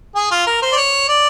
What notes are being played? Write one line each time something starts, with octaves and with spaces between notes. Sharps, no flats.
G#4
F4
A#4
C5
D5
C#5
D5